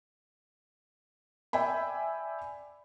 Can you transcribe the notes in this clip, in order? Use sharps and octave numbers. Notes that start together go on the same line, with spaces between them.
D5 E5 G5 G#5 B5